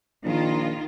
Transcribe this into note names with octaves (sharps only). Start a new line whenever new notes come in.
A#1 D#3 F4